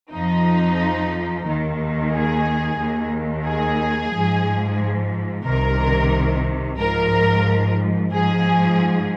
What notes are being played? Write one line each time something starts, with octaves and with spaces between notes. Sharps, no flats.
F2 F3 D#4
D#2 D#3
G#4
D#2 D#3
G#4
G#2 F3
C2 C3 D#3 A#4
G#2 F3 A#4
G#2 F3 G#4